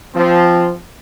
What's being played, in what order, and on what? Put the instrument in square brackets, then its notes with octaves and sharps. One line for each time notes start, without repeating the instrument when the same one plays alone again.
[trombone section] F3 C4